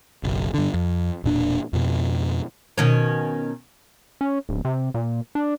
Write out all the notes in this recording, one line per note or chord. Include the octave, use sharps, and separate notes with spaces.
F#1 B1
G2 D3
F2
E1 A#2 D4
F2 B2
B2 D#3 C#4
C#4
D1
C3
A#2
D4